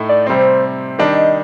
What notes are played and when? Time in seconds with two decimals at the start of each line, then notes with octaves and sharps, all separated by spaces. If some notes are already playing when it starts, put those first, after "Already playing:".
Already playing: A2 A3 D#4
0.09 D5
0.26 C3 G3 C4 C5
0.99 D#3 G3 D4 D#5